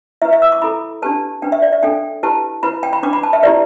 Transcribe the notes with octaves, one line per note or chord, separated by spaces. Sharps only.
E4 B4 E5
E5
E6
D6
E4 A4 B5
D4 G4 B4 A5
D4 B4 G5
E5
D5
E5
D4 A4 G5
E4 G4 B4 A5
E4 B4 B5
G5
B5
D4 B4 D6
B5
A5
E5
E4 G4 B4 D5